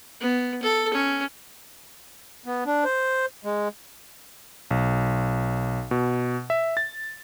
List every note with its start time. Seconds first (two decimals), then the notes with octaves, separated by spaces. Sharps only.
0.20 B3
0.63 A4
0.94 C#4
2.46 B3
2.66 D4
2.85 C5
3.45 G#3
4.71 B1
5.91 B2
6.50 E5
6.77 A6